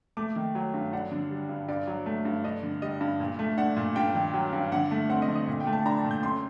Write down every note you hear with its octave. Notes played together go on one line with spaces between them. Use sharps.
A3 D6
D#3
F#3
G2
D4 F#5
D3
G3
G2
G2 D5
F#3
A3
G2
D4 D#5
D3
G3 D#5
G2
A#2
A3
D4 F#5
A#2
G2 G5
D#3
F#3
G2
D3 F#5
A3
C4 F#5
D#5
D3
D#5
A#2
G5
A3
A5
D4 A#5
A5
A#2
G6
F#2 C6